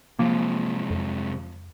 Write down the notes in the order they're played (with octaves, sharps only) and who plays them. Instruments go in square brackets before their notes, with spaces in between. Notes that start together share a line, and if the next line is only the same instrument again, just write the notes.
[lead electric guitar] C3 G#3 [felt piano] F3 [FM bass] A#3
[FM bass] F2